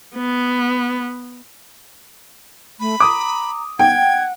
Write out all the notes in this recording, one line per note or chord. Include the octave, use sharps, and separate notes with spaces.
B3
A3 B5
A#5 D6 D#6
F#5 G5 G#6